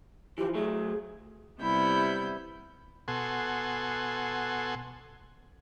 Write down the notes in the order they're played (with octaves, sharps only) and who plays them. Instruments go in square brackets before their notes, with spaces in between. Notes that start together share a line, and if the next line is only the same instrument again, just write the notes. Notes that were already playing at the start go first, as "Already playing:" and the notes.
[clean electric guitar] E3 F3 [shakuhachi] G4
[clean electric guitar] F#3 A3 [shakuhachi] G#4
[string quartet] C3 G3 B3 E4 B5 G6
[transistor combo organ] B2 A4 F#5 G#5 C6